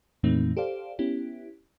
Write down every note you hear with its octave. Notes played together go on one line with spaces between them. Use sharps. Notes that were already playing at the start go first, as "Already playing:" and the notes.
F2 A#2 E3 A3 C4 D#4
G4 A4 C5 D5 F5
B3 C#4 E4 G4